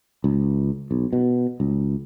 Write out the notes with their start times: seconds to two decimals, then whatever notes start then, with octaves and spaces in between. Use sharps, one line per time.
0.24 C#2
0.91 B1
1.13 B2
1.60 C#2